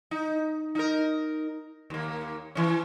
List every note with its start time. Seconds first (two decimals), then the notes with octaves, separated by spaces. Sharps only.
0.11 D#4
0.75 D#4 A#4
1.90 D#2 A#3
2.55 E3 C#4